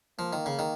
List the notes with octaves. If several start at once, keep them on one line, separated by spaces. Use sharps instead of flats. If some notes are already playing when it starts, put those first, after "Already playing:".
F3 A#3
D#3
C#3
D#3